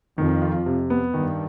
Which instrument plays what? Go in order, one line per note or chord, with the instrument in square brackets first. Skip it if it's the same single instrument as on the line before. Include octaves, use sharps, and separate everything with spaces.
[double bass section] F2 [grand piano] D#3
[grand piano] F4
C3
B3
[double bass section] G2 [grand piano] D#3